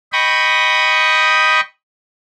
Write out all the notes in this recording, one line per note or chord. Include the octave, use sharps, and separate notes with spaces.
D#5 G5 B5 C#6 D#6